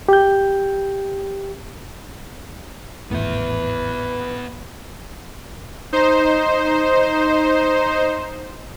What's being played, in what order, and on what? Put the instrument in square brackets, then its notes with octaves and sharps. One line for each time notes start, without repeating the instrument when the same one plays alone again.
[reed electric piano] G4 G6
[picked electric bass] G#1 E2 A2 [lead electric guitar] B3 E5 [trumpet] B4
[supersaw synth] D#4 C5